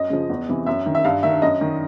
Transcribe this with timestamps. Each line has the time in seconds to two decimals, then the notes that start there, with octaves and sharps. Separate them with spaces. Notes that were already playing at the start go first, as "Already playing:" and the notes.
Already playing: F#2 D#5
0.10 C#3 F3
0.30 E2
0.48 C3 E3
0.66 F#2 E5
0.86 D#3
0.95 E5
1.04 G2 F5
1.23 D#3 E5
1.42 F#2 D#5
1.61 D#3